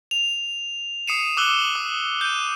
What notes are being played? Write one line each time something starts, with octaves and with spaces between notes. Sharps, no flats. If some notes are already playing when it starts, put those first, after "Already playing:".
F7
D#6 C7 C#7 D#7 E7
D6 E6 F#6 G7
D#6
G6 D#7